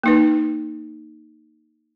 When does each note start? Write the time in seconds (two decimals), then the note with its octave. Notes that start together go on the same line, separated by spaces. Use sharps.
0.03 A#3 D#4 B4